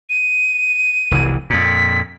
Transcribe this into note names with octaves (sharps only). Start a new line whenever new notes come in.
D#7
F1 C2 E3
F2 A#2 B6